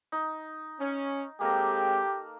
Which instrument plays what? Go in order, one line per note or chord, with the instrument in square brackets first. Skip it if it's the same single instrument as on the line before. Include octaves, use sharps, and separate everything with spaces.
[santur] D#4
[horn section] C#4
[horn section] G#3 C4 G5 [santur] A#3 A4 A#5 [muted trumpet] G4